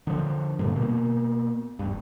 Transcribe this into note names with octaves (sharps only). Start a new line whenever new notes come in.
D3 F3
G2 A#2 D3
B2 A#3
F1 G2